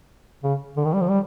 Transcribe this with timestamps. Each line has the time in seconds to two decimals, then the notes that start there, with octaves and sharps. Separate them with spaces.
0.44 C#3
0.77 D3
0.85 D#3
0.93 G3
1.01 F3
1.09 G3